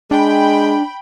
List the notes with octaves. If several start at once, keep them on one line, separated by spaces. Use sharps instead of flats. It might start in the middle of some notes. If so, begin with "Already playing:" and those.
G#3 D4 G5 B5